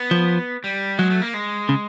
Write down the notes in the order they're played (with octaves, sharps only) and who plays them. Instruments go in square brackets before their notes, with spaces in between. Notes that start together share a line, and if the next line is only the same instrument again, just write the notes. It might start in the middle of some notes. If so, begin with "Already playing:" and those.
Already playing: [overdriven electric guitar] B3
[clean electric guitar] F3
[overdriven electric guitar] G3
[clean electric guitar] F#3 [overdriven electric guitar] G#3
[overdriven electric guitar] A3
A#3
G#3
[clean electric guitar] C#3